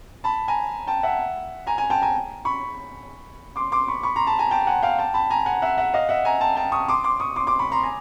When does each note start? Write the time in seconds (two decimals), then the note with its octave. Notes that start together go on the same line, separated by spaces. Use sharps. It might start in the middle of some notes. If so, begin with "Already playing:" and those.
0.24 A5 B5
0.48 G#5 A#5
0.87 G5 A5
1.03 E5 F#5
1.67 G#5 A#5
1.78 G#5 A#5
1.90 G5 A5
2.02 G#5 A#5
2.45 B5 C#6
3.56 C6 D6
3.72 C6 D6
3.88 B5 C#6
4.03 B5 C#6
4.16 A#5 C6
4.27 A5 B5
4.39 G#5 A#5
4.51 G5 A5
4.67 F#5 G#5
4.83 F5 G5
4.98 G5 A5
5.14 A5 B5
5.30 G#5 A#5
5.46 F#5 G#5
5.62 E5 F#5
5.78 E5 F#5
5.94 D#5 F5
6.09 E5 F#5
6.25 G#5 A#5
6.41 G5 A5
6.56 G5 A5
6.72 C#6 D#6
6.88 C6 D6
7.04 C6 D6
7.20 C#6 D#6
7.36 C6 D6
7.47 C6 D6
7.59 B5 C#6
7.71 A#5 C6
7.83 G#5 A#5